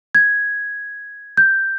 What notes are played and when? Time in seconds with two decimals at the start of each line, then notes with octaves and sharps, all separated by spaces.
0.15 G#6
1.37 G6